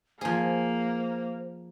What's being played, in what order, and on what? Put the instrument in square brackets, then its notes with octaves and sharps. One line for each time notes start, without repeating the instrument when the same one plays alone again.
[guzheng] F3 G#4 [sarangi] A#3 [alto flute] C5